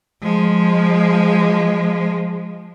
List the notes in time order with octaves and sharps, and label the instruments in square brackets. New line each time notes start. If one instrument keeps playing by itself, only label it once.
[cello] F3 G#3